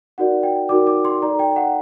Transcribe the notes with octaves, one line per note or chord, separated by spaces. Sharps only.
D#4 F#4 A#4 D5 F#5
G5
D#4 F#4 A#4 D5 D6
D6
C6
D#4 A4 D5 A#5
G5
F#5